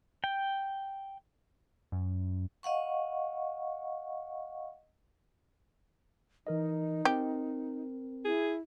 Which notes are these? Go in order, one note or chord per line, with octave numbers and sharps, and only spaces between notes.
G5
F#2
D#5 F5 F#5 C#6
E3 D#4 A#4 D#5
C4 G4 A#4
E4 G#4